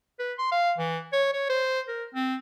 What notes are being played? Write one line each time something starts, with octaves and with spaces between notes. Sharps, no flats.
B4
C6
F5
E3
C#5
C#5
C5
A#4
C4